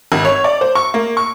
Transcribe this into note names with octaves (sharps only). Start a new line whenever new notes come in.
G#1
C#5
D5
C5
C#6
A#3
C#6